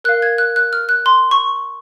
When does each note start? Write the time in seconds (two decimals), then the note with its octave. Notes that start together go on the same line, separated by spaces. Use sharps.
0.04 A#4 F5 F#6
0.22 G#6
0.38 F#6
0.56 F#6
0.73 F6
0.89 F#6
1.06 C6
1.31 C#6